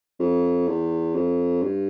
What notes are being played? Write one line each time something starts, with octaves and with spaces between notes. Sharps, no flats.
F2
E2
F2
G2